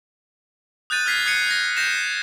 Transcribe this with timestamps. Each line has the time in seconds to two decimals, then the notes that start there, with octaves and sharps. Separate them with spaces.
0.90 D#6 F#6 G6 A6 D#7
1.06 F6 G#6 B6 C7
1.26 D#6 F#6 G#6 C7 C#7 D#7
1.47 F#6 G#6 A#6
1.77 G6 A#6 C7 E7